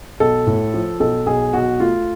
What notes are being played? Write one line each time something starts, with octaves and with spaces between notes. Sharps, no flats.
B1 A4
A2
F3
B1 A4
B1 G#4
B1 F#4
A3 F4